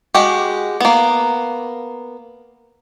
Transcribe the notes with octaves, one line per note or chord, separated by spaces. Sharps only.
G#3 F#4 G4
A#3 B3